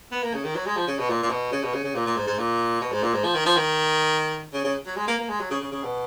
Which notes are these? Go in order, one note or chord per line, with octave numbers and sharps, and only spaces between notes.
B3
A#3
C#3
D#3
F#3
G#3
F3
C#3
B2
A#2
A#2
B2
C#3
B2
C#3
C#3
A#2
A#2
G#2
G#2
A#2
B2
G#2
A#2
G#2
F3
D#3
F3
D#3
C#3
C#3
F#3
G#3
A#3
A#3
G#3
F#3
C#3
C#3
C#3
B2